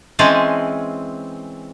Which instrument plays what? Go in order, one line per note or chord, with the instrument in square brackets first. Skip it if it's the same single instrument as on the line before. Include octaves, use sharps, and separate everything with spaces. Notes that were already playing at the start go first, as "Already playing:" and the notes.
[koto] E3 G#3 C4 C#4 G#5 A5